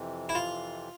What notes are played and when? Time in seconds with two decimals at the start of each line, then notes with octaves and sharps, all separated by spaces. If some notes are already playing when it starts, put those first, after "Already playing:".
Already playing: F2 C3 E3
0.29 E4
0.35 F4